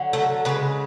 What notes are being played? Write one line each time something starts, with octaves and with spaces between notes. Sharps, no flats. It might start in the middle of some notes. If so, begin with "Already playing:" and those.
Already playing: D3 F#3
A3 A4
C#3 G#3 B3 B4